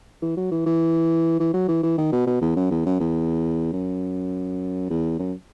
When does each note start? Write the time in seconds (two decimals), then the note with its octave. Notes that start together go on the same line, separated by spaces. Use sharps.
0.22 E3
0.37 F#3
0.51 E3
0.66 E3
1.40 E3
1.54 F#3
1.68 E3
1.83 E3
1.98 D#3
2.12 B2
2.27 B2
2.42 E2
2.56 F#2
2.71 E2
2.86 F#2
3.00 E2
3.73 F#2
4.90 E2
5.20 F#2